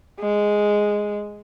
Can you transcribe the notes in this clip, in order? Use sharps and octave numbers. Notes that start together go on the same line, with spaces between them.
G#3